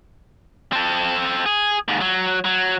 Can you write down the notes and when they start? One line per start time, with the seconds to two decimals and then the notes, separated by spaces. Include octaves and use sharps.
0.73 C4 A4
1.46 G#4
1.88 D#2 G#2
2.01 F#3
2.45 F#3